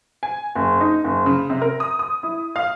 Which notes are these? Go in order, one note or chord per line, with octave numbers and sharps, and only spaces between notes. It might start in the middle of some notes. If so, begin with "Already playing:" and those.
G#5
F#1
D#4
F#1
C#3
C3
A#4
D#6
D#6
E4
F5